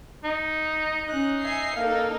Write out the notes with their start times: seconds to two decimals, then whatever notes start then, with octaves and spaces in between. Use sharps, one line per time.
0.24 D#4
1.08 C#4 D#4 F#6
1.40 E5 G#5 C7
1.76 A#3 D#4 A4 F5